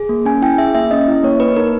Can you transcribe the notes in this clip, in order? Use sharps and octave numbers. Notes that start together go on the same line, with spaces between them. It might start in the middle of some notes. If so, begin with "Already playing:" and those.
Already playing: G#4
A#3
C#4 G#5
E4 G5
G#4 E5
A#3 E5
C#4 D#5
E4
A#3 C#5
A#3 B4
D#4 A#4